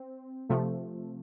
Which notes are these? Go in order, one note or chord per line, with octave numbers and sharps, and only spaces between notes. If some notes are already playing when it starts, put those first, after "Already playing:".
Already playing: C4
C3 F3 A3